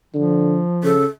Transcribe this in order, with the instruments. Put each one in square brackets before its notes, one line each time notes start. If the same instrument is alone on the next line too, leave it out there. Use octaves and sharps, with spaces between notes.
[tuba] D3 [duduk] F3
[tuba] C#3 [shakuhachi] A4